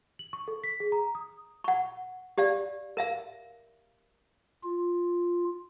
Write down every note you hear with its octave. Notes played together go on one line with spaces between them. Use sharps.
F#7
C#6
A4
B6
G#4
A#5
D#6
F#5 C#6
G4 D5 F5
A#4 E5 F5
F4